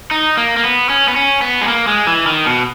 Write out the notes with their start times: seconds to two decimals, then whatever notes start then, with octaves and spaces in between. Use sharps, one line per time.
0.11 D#4
0.37 A#3
0.57 A#3
0.63 B3
0.90 C#4
1.08 B3
1.16 C#4
1.42 B3
1.61 G#3
1.68 A#3
1.87 G#3
2.07 E3
2.27 D#3
2.46 B2